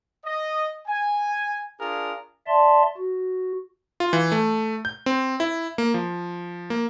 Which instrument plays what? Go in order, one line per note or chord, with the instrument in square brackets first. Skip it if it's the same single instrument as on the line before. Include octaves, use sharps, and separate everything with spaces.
[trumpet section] D#5
G#5
D4 F4 G#4 A#4
[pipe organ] D5 E5 A5 C6
F#4
[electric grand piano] F4
E3
A3
G6
C4
E4
A#3
F3
A#3